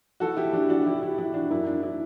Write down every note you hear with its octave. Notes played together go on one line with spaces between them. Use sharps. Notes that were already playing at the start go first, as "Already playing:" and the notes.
E3 F#4 A4
E4 G4
E3 D4
D4 F#4
E3 E4 G4
E4
E3 E4
D4 F#4
F#2 E4
D4
E4